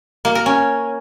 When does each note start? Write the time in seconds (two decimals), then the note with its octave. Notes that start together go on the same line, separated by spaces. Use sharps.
0.25 A#3
0.35 A#4
0.46 C#4